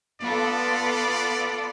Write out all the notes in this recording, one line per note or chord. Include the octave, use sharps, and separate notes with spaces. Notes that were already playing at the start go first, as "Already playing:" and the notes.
B3 F4 A4 D5